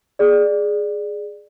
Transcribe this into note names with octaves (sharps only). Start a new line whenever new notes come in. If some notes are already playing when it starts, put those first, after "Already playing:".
G#4 D5